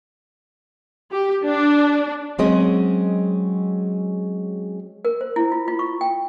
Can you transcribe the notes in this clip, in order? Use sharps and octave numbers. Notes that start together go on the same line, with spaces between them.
G4
D4
F#3 G#3 C4 C#4 G#4 D#5
A#4
C5
E4
F4
F4
C#6
G5